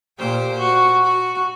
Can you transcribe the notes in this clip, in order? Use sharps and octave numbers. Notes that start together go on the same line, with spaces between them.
A#2 G4 C5
F#4
F#4